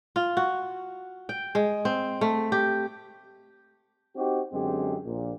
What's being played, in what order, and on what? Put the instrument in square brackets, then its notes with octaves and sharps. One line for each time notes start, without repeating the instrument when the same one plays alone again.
[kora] F4
F#4
G5
G#3
C4
A3
G4
[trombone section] C4 D#4 F#4 G4
F#2 D3 G#3 C4 G4
A#1 A#2